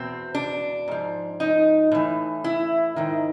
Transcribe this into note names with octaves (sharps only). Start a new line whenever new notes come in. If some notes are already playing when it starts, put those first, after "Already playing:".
Already playing: E2 B2 C4
D4
G#2 F3
D#4
A2 E3
E4
G#2 D#3